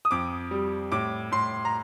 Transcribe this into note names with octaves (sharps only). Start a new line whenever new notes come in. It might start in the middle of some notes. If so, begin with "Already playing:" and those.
D#6
F2 D6
G3
A2 D6
A2 C6
A#5